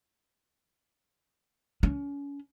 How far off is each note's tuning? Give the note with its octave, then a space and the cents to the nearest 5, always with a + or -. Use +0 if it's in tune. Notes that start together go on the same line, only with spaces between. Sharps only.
C#4 +35